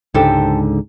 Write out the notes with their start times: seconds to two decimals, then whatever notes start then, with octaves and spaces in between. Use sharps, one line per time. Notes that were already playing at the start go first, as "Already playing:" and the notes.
0.14 C#2 G#2 D3 G4 A4 C5